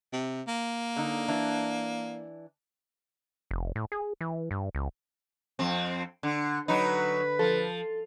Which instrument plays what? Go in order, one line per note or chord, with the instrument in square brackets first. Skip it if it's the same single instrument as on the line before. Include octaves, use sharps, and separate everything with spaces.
[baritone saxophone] C3
A#3
[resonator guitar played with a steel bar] D3 D#4
E3 D4
[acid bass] F1
A2
G#4
E3
G2
C#2
[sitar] F2 C4
D3
[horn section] D3 B4 [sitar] F#3 D#4
[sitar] F3 [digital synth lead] A4